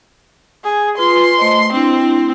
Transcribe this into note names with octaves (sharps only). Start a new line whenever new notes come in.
G#4
F4 B4 C6
A3 C5 D#5
C4 D4 E4